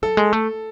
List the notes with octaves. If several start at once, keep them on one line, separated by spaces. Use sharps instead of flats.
F#3 A4
G#3
A3